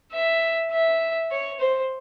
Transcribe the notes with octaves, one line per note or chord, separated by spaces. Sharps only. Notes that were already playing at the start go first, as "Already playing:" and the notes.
E5
E5
C#5
C5